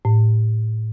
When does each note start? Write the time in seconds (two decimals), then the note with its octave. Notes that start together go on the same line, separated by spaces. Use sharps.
0.05 A2